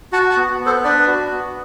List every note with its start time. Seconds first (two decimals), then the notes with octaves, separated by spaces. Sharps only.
0.12 F#4 F#5 A5
0.30 F#5 A5
0.37 B3
0.60 B3
0.66 A4 C5
0.84 D4 B4 D5
1.08 F#4
1.31 B3